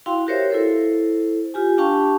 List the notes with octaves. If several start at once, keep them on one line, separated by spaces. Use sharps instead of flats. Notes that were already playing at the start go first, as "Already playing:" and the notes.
E4 F#4 F5 G5 C6
F#4 G4 A#4 C5 C#5 E5
E4 A4 C5
F4 G4 G#5
D4 G4 F5 G5 A5 C#6